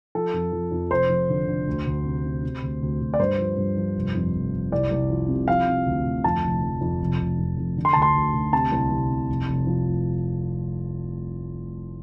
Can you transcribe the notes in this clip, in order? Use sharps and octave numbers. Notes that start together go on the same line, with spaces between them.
F3 A4
F2
F3
F2
F1 C5
F3
D3
D3
D2
D2
C3
C3
C3
D2
D2
D2
D5
G2 C5
F3
G2
F3
F1
F2
F1
F1
C2 D5
C2
F3
C3
F3 F5
C3
D2
D2
F2 A5
F1
F2
F2
F1
F1
F2
F2
D3
C6
D2 A5
C6
D2
D2
C3 A5
C2
C2
C3
F1
F1
F3
F1